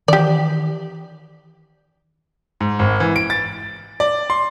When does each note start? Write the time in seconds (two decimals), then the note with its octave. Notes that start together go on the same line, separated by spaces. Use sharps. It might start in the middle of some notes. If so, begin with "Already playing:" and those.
0.08 D#3 E3 G4 D5
2.60 G#2
2.79 G#1
3.00 E3
3.16 D7
3.30 A6
4.00 D5
4.30 C6